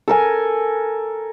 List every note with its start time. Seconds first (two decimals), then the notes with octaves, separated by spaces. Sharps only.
0.08 A4 A#4 G#5